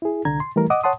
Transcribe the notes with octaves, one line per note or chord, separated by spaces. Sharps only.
E4 G#4
C2 D3 A#5 G#6
C6
E3 G3 A3 A#4
D#5 F#5 D6 D#6
C#5 F#5 A5 C6 D#6